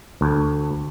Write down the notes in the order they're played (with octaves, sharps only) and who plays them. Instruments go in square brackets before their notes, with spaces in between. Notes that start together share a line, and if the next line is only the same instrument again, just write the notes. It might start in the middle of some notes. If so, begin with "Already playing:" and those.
[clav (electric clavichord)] D2